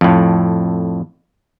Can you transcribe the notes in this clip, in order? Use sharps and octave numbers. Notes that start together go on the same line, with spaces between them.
F2 A2